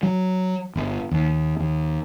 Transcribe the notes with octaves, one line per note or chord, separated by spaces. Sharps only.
F#3
G1
D#2
D#2